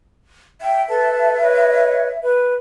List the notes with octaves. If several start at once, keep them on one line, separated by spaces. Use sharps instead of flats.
E5 G5
A4 B4 A5
B4 C#5 D#5
B4